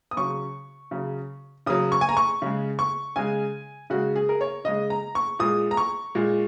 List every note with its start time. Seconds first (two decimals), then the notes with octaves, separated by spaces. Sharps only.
0.11 D#6
0.17 C#3 F#3 C#6
0.91 C#3 F#3
1.66 C#3 F#3 D#6
1.92 C#6
2.01 G#5
2.09 A#5
2.17 C#6
2.42 C#3 G#3
2.79 C#6
3.16 C#3 G#3 G#5
3.90 C#3 G#3 F#4
4.16 G#4
4.29 A#4
4.41 C#5
4.65 C#3 G#3 D#5
4.90 A#5
5.15 C#6
5.39 A#2 G#3 D#6
5.71 A#5
5.77 C#6
6.15 A#2 G#3